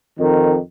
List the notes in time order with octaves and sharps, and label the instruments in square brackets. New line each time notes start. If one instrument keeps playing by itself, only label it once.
[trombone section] F2 D#3